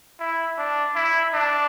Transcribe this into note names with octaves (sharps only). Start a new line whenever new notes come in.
E4
D4
E4
D4